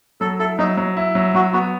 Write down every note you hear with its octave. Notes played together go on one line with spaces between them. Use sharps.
F#3 A4
E4 A4
F#3 D#4
F#3
E4
F#3
F#3 F#4
B3 F#4